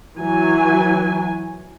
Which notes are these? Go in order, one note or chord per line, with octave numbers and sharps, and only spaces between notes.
E3 F#3 G#5